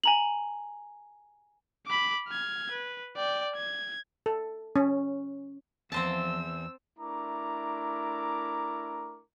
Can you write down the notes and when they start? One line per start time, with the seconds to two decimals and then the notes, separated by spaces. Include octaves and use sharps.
0.04 G#5 A#5 F#7
1.87 B5 D6
2.28 F6 G#6
2.71 B4
3.16 D5 G5
3.56 G#6
4.26 A4
4.76 C#4
5.92 E2 F3 C4 C5 A5 E6
6.99 A3 D4 E4 A#4 A#5 D6